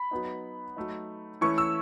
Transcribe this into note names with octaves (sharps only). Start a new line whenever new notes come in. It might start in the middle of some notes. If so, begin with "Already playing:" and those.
Already playing: B5
F#3 B3 D#4
F#3 A3 D#4
E3 A3 C#4 E4 C#6
E6